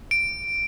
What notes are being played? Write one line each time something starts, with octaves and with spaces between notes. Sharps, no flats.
D7